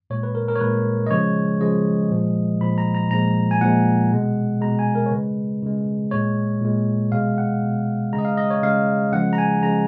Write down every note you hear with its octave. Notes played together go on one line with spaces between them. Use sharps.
A#2 G#3 C#5
B4
A#4
A#4
C#5
A#2 G#3 B4
D#5
C#3 F3 G#3 C#5
C#3 F3 G#3 D#5
A#2 F3 G#3
A#2 F3 G#3 B5
A#5
A#5
A#2 F3 G#3 A#5
G#5
A#2 F3 G#3 F#5
B2 G#3
B2 G#3 A#5
G#5
A#4
C#5
C#3 G#3 B4
C#3 G#3
A#2 G#3 C#5
A#2 G#3
B2 G#3 F5
F#5
B2 G#3
C#3 G#3 A#5
D#5
F5
D#5
C#5
C#3 G#3 F5
C#3 F3 G#3 F#5
A#5
G#5
C#3 F3 G#3 A#5